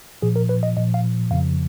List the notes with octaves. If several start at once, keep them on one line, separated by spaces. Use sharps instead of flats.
A#2 F3 G#4
A#4
B4
D#5
A#2 F3 D#5
F5
F2 C#3 F3 F5